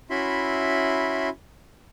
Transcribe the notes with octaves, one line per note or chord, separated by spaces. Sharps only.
C#4 E4 F#4 E5 B5 C6